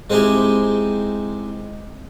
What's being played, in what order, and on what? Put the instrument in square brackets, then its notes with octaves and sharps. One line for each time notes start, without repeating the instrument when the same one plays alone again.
[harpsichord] G#3 C4 D#4 E4 G4 G#5